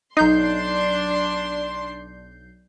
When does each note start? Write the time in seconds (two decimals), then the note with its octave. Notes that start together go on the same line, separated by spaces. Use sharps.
0.17 B1 D4 D#4 C6 G6 C7